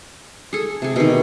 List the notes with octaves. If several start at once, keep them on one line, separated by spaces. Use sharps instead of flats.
G#4 A4
C3 G#4
B2 D#3